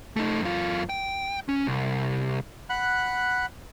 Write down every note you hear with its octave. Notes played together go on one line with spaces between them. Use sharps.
A3 D#4
F#2 F4
G5
C#4
C2
F#5 B5 F#6